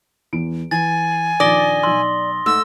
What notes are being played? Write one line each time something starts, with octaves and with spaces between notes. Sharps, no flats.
E2 B3 D7
E3 G#5 A6
A#1 D#3 D5 D#6 A#6 G7
B1 C6 E6
G#2 A3 E6